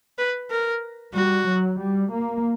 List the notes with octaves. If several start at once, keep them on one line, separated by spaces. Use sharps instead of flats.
B4
A#4
G3 F#4
F#3
G3
A#3